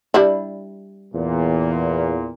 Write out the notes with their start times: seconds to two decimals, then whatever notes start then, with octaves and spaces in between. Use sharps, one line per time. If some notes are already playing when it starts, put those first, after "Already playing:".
0.14 G3 D4 E4
1.13 E2 A#2